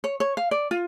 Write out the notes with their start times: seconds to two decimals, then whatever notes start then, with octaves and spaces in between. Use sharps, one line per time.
0.04 C#5
0.20 C#5
0.37 F5
0.51 D5
0.71 F4